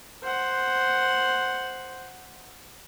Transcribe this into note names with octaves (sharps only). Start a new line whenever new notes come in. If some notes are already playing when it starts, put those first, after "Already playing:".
C5 F#5